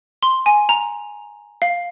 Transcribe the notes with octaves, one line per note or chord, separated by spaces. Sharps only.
C6
G#5
A#5
F5